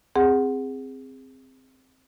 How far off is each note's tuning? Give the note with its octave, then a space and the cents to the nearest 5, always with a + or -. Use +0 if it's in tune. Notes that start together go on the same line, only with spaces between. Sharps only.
C4 +0 G#4 -15 F#5 +0